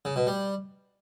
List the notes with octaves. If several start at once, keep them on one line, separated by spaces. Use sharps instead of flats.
C#3
B2
G3